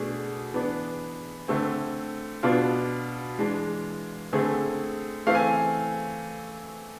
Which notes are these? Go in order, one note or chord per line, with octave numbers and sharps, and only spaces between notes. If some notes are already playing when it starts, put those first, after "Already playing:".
Already playing: B2 A3 D4 G#4
E3 B3 D4
D3 A3 C4
B2 B3 D4 F4
E3 G#3 D4
D3 A3 C4 G#4
E3 A3 C4 F5
G#5